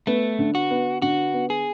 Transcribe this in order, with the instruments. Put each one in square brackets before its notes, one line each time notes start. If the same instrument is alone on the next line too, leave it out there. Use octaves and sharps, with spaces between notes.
[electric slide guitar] A3 [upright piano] B3
[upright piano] D3
[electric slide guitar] F#4
[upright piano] B3
[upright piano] D3 [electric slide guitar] F#4
[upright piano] B3
[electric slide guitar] G#4